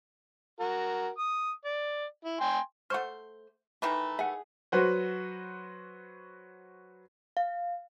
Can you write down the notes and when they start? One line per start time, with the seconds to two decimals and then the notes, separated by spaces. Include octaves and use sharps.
0.60 F#4 A#4
1.18 D#6
1.65 D5
2.25 E4
2.41 G5 G#5 C6
2.90 A3 C5 F#5 C#6 F6
3.82 D#3 E3 A3 B4 A#5
4.19 G#4 E5 F#5
4.72 F#3 F#4 B4 C5
7.37 F5